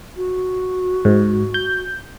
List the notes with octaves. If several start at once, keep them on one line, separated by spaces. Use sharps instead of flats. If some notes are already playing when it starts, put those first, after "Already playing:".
F#4
G#2
G6